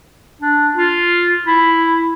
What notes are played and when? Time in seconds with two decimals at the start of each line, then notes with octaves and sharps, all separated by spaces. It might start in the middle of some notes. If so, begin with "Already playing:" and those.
0.42 D4
0.76 F4
1.47 E4